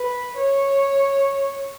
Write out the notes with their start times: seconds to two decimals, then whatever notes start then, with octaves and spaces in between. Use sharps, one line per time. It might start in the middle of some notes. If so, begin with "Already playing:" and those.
Already playing: B4
0.36 C#5